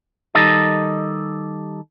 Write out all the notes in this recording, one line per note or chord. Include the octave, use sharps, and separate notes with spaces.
D#3 G3 D#4 G4 A4 D#5